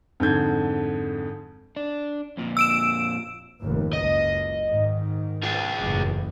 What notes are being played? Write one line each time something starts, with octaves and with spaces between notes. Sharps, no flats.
F2 G#2 D3 G6 G#6
D4
F2 A#2
E6 D7 E7
F1 D#2 G#2
F#1 C#2 D#5
G#2 D#3
F4 G#4
F#1 E2 A2